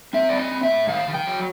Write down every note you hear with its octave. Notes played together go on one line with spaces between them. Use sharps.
C4 E5
C4 D5
D#5
C4
E5
A2
D#3 F5
D#3
G5
F#3